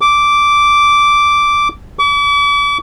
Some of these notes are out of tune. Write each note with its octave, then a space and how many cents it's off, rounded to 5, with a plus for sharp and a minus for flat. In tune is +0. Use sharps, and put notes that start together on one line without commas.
D6 -5
D6 -40